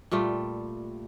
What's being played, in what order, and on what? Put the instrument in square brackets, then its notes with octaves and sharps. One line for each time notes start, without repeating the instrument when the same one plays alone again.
[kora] A#2 G3 A3 F4